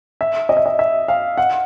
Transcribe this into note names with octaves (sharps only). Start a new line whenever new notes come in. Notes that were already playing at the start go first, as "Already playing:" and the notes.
E5
D#5
E5
D#5
E5
F5
F#5